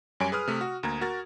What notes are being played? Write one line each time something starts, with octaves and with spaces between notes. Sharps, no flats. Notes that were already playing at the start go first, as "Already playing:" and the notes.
F#2 G3 C#5 G#5 D7
G#4 B4 D#6 F6
C3 A3
F#4
D2 A#3 A#5 G#6
F#4 A#4 A6